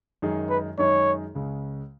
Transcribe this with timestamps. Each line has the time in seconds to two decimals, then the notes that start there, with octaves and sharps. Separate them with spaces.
0.22 F#2 D#3 G#3 D#4 G#4
0.50 B4
0.78 F#2 D#3 G#3 D#4 G#4 C#5
1.35 C#2 C#3 G#3